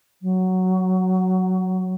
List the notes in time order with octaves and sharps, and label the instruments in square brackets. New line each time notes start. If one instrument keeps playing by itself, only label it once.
[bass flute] F#3